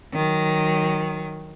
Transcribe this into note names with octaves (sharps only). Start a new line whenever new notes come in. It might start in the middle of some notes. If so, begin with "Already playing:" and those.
D#3 F#3